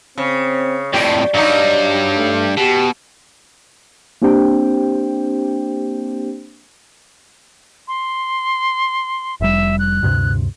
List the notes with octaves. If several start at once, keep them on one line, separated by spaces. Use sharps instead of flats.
C#3 C4
F2 A2 G4 D5
G2 F#3 G3 D#4
A3
B2 G4
A#3 C4 D4 G4 C5 G5
C6
F1 G3 E5
F#6
D2 G2 C3